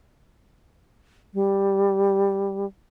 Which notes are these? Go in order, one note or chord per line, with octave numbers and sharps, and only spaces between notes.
G3